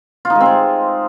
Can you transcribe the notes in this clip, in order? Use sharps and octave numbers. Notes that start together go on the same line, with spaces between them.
F4
D#4
G#3
C4
G#3